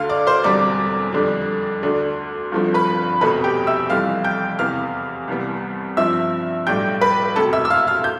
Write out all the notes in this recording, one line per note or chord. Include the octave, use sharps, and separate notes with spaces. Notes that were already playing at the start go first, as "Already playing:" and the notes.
Already playing: D2 D3 A3 F5 F6
D5 D6
C5 C6
E1 E2 D3 G3 C4 D5 D6
F2 D3 G3 D4
D2 D3 A3 D4
G1 G2 F3 A3 C4
B4 B5
F1 E2 B2 A3 C4 B4 B5
G4 G5
E5 E6
F1 F2 E3 G3 F5 F6
G5 G6
E2 C3 E3 B3 F5 F6
C2 C3 E3 G3 B3
G2 F3 C4 E5 E6
B1 A2 G3 D4 G5 G6
B4 B5
E1 D2 C3 A4 A5
E5 E6
E6
F5 F6
F5 F6
G6